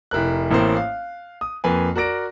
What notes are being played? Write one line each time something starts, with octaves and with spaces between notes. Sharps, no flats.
F1 E4 A#4 F#6
A1 A2 A#3 C4 A#4 C5
F5
D#6
F2 A#3 B4 G#5
F#4 A#4 D5 A#6 D7